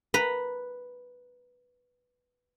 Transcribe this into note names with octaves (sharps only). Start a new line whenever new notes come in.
B4 A#5